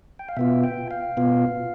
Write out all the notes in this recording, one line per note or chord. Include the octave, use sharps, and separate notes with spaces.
G5
F5
B2 B3 F4 E5
G5
F5
B2 B3 F4